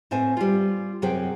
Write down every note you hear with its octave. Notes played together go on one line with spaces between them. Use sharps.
A2 A3 C4 C5 G#5
G3 F4
F#2 C3 F#3 G#4 C5 G5